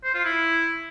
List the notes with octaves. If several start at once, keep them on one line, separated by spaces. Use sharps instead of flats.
C5
F4
E4